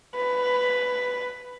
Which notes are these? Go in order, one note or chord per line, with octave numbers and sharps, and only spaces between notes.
B4